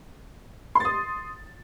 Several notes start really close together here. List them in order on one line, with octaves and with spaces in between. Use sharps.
C6 A6 D#6